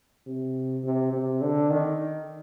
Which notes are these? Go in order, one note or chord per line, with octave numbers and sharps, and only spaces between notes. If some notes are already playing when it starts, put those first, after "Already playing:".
C3
C3
C3
D3
D#3